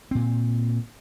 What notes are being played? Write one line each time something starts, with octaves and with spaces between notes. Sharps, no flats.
A#2 C4